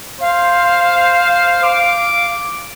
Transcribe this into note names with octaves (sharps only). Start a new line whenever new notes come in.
C5 F5
D6